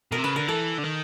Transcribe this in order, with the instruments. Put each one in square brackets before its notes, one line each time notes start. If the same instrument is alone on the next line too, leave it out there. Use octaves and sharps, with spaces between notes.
[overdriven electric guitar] B2 [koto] A#4
[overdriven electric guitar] C3
[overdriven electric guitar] C#3 [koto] B4
[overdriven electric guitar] D3 [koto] A#4
[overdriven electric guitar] E3 [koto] A4
[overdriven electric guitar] D3
D#3